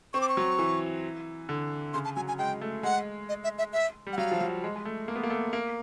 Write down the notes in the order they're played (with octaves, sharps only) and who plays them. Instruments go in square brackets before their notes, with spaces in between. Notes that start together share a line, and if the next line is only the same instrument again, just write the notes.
[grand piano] C4 [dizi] C#6
[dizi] D6
C#6
[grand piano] F#3
E3
D3
[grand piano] C#3 [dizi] C6
[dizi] A5
[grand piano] F#3 [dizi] G#5
[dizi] G#5
[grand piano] G#3 [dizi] G5
[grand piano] A3
[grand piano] G#3 [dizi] F#5
[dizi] D#5
E5
E5
E5
[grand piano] G3
[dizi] F#5
[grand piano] F#3 [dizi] F5
[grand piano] F3
F#3
G#3
G#3
A3
A#3
B3
A#3
A3
A#3